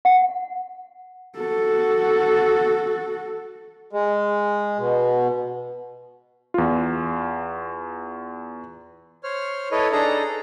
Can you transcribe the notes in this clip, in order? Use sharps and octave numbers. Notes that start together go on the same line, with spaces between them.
F#5
F#4 A4
G#3
B2
E2 F4
C5 C#5 F6
E4 A4 B4 C#5 D#5
D4 D#4 G#4 A4 A#5
A4